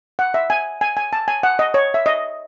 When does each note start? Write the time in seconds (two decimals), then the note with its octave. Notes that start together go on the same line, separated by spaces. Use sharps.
0.19 F#5
0.34 E5
0.50 G#5
0.81 G#5
0.97 G#5
1.13 A5
1.28 G#5
1.43 F#5
1.59 D#5
1.74 C#5
1.94 E5
2.06 D#5